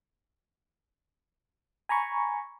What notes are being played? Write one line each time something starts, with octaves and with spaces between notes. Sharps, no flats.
G#5 A#5 B5 C#6